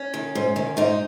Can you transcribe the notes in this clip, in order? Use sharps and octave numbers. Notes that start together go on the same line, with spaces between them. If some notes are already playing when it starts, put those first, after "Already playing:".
Already playing: C#4
D#3
G#2
D#3
G#2 D#4